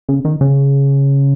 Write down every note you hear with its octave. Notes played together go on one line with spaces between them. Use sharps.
C#3
D#3
C#3